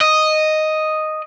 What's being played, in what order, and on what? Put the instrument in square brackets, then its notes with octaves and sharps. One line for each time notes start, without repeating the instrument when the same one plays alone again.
[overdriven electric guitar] D#5